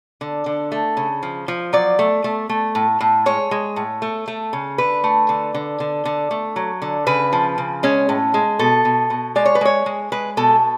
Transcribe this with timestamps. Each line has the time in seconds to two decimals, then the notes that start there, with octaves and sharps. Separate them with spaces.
0.21 D3
0.46 D3
0.72 A3
0.97 C#3
1.23 F3
1.48 F3
1.73 F#3 D5
1.99 A3
2.24 A3
2.49 A3
2.75 A2
3.00 A2
3.26 G#3 C#5
3.51 G#3
3.76 A2
4.02 A3
4.28 A3
4.53 C#3
4.78 D3 B4
5.04 A3
5.29 D3
5.54 D3
5.80 D3
6.05 D3
6.31 A3
6.56 F#3
6.82 D3
7.07 C#3 B4
7.33 F3
7.58 C#3
7.83 G#3 C#4
8.09 A2
8.34 G#3
8.59 B2 A4
8.85 B2
9.10 B2
9.35 G#3 D5
9.46 C#5
9.55 B4
9.61 G#3 C#5
9.86 G#3
10.12 G#3 B4
10.37 B2 A4